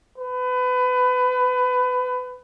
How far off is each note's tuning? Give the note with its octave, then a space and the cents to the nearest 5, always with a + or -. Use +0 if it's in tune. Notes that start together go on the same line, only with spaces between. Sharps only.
B4 +25